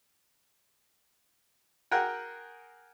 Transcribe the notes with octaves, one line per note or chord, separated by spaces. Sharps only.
F#4 G#4 A#4 F#5 G5